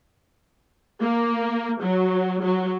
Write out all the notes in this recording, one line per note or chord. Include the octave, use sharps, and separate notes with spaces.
A#3
F#3
F#3